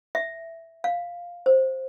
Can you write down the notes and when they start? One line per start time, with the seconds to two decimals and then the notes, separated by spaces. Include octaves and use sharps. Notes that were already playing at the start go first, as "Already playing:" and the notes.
0.15 E5
0.84 F5
1.46 C5